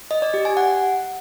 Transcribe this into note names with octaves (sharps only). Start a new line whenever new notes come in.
D#5
D5
G4
G#5
F#5